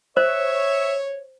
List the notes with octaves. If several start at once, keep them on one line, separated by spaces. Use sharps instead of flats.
C5 C#5 E5